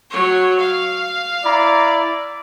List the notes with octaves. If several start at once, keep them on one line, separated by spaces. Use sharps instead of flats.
F#3 C#5
F5
E4 D5 A#5